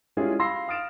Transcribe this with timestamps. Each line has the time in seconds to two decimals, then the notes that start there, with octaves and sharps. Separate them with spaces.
0.17 G3 G#3 C#4 E4 F4 G#4
0.39 F5 B5 C6 E6 A#6 C7
0.68 F5 D#6 F6 A6 D7 E7